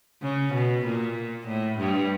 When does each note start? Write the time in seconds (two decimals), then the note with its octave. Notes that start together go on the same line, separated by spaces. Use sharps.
0.22 C#3
0.53 B2
0.85 A#2
1.47 A2
1.78 G2